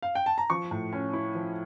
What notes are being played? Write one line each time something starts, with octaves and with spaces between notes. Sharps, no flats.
F5
G5
A5
A#5
F3 C#6
A2
C#4
E4
F3